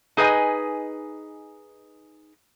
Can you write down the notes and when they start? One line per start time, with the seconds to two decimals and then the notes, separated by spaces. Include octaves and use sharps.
0.17 D#4 G#4 B4 D#5 G#5